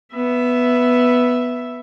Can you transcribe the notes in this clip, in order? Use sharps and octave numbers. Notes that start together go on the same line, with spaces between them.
B3 E5